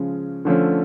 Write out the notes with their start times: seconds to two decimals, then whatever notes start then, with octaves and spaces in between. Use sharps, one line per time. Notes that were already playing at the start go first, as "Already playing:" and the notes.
Already playing: C#3 F3 G#3 C#4
0.45 D3 F3 A3 C#4